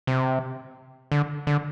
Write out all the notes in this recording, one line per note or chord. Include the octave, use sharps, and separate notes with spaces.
C3
D3
D3